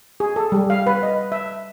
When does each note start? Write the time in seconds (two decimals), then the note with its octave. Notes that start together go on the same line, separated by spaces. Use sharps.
0.20 G#4
0.36 A4
0.52 G3
0.70 F5
0.87 B4
1.03 D#5
1.32 E5